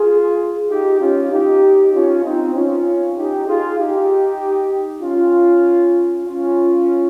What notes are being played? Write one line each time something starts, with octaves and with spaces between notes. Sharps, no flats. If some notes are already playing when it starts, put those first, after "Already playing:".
Already playing: F4 G#4
D#4 G4
C#4 F4
D#4 G4
C#4 F4
C4 D#4
C#4 F4
D#4 G4
F4 G#4
D#4 G4
C#4 F4
C#4 F4